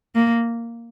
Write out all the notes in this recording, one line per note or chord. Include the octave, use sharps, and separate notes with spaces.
A#3